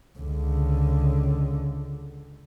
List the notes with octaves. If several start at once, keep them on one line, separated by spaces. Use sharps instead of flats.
C#2 D3